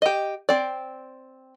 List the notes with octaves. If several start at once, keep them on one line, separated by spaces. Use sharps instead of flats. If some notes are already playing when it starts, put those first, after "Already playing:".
G4 D#5
C4 D5